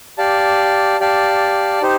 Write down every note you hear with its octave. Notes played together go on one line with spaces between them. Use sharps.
G4 D5 F5 A5
G4 D5 F5 A5
D#4 G4 C5